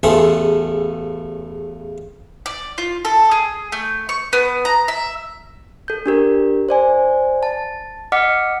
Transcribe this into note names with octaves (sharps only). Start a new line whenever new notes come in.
A1 E2 C#3 A3 G#4 C6
D5
F4
A4
G#4
A3
C#6
B3
A#5
E5
A4 G6
D4 G4 A#4
C5 D5 G#5
A5
D#5 F#5 D6 F6 B6 C#7